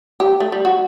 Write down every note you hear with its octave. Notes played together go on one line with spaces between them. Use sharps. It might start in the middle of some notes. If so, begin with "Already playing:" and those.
G4
A3
G3
F#4